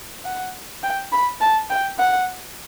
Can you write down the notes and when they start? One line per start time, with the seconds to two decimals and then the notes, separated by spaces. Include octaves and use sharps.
0.25 F#5
0.83 G5
1.12 B5
1.41 A5
1.70 G5
1.99 F#5